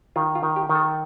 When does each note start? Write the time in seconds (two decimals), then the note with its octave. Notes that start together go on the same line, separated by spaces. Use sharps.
0.16 D#3 F4
0.35 F4
0.43 D#3
0.56 G4
0.69 D#3
0.75 A4